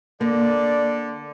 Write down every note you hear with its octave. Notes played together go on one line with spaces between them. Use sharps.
D3 A#3 D5